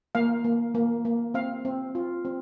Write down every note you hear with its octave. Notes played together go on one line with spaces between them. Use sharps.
A#3 F5
A#3
A#3
A#3
C4 F5
C4
F4
C4